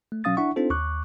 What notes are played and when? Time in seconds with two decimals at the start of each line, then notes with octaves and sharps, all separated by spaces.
0.12 A3
0.24 B2 F#3 C#4 F5 D#6 A6
0.37 D4 E4 E5 F#5 C#6
0.56 C4 D4 D#4 F4 A4 C5
0.70 D#2 C#6 D6 F#6